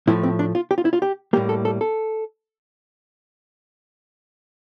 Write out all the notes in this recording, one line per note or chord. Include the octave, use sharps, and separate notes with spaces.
A2 F3 A3 E4
C4
D4
F4
G4
F4
E4
F4
G4
A2 G3 A#3 G4
A4
A4
A4